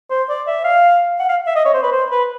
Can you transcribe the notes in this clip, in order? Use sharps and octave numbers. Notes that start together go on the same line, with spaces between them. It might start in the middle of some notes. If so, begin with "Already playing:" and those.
C5
D5
E5
F5
F#5
F5
E5
D#5
C#5
C5
B4
C5
B4